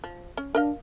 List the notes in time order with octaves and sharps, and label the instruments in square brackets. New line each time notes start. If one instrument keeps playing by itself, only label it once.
[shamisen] F3
C#4
[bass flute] D4 [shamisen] A#4 D#5 F5